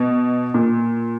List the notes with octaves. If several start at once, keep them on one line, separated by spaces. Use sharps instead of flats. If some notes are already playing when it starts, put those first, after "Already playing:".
Already playing: B2
A#2